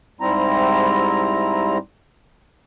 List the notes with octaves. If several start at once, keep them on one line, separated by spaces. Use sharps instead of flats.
G#2 G3 C4 E4 A#5